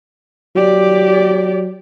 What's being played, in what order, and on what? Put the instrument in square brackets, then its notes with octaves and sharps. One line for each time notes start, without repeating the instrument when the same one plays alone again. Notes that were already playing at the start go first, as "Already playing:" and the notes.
[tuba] F#3 [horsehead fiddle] G4 D5